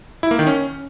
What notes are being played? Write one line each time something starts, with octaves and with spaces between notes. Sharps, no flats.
E4
A#3
D#3
C#4